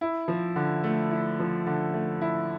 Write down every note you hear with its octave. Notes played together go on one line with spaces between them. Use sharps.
E4
F3
D3
A3
E4
F3
D3
A3
E4